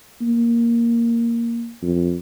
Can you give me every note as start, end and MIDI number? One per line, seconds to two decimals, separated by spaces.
0.21 1.72 58
1.82 2.18 41